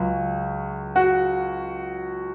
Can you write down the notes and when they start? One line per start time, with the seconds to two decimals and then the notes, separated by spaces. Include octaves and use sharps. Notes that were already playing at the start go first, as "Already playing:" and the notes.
Already playing: C#2 F#3
0.96 F#4